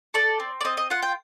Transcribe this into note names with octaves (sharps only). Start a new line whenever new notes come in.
A4 D5
C4
D5
C4 D#5
D#5
F4 F#5
G5